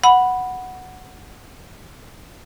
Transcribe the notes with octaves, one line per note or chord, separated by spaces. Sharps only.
F#5 B5